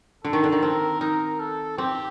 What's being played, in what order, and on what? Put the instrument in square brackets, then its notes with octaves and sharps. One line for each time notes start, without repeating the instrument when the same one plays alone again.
[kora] D3 [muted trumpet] A4
[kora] D#3
D3
D#3
[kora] C4 [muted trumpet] A#4
[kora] D#4 [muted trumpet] A#4
[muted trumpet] A4
[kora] C4 [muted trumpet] G4